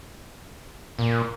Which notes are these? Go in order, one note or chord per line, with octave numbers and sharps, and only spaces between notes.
A#2